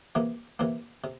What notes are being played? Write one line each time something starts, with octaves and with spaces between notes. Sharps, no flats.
C3 E3 A#3
C3 E3 A#3
C3